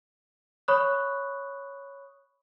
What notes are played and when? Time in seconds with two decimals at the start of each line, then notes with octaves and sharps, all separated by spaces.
0.68 C#5 B5 C#6 D#6 F#6